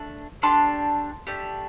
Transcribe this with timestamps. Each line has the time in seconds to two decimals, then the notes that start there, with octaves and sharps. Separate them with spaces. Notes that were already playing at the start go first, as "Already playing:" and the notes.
Already playing: A3 D4
0.42 A3 D4 G4 A5 C6
1.27 A3 D4 G4